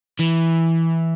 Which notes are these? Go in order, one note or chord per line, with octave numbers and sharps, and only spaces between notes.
E3